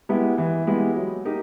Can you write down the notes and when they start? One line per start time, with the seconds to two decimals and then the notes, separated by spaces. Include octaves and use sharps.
0.09 G#3 B3 E4 G4
0.38 E3
0.67 G#3 B3 E4 G4
0.96 F#3
1.25 A#3 D#4 G4